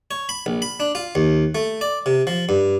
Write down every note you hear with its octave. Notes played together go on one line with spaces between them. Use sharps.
C#5
B5
A#1
B5
D4
F4
D#2
A3
D5
C3
F3
G2